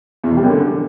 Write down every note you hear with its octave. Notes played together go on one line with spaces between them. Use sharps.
E2
B2
G3
F#2
D3